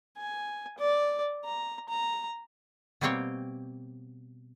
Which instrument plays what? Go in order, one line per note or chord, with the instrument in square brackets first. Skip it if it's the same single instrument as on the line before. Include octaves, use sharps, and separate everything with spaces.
[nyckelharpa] G#5
D5
A#5
A#5
[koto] B2 G3 A#3 C4 C#5 G5